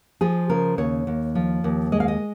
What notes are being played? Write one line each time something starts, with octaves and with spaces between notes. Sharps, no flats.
F3 G#4
C#3 A#4
D#2 C#5
D#2
F3
D#2
G#3 D#5
F5
D#5